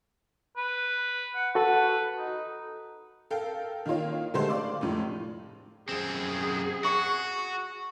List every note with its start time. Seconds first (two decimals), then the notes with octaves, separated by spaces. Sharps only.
0.57 B4
1.35 F#5
1.55 F#4 A4 B4
2.18 D#4
3.31 A4 A#4 F5 G5
3.85 D#3 A#3 D#4 F4 C#5
4.34 D3 G#3 A3 G4 A4 C5
4.49 D5 F5 C6 D6
4.81 F1 A2 F3
5.89 F#2 C4 G#4
6.84 F#4 C#6